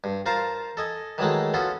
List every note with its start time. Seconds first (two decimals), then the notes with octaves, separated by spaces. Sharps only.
0.04 G2
0.26 F4 A#4 C5 F5 A5 A#5
0.77 A4 D#5 G#5
1.18 D#3 E3 F#3 G#3 A3
1.54 B3 C#4 F4 F#4 A4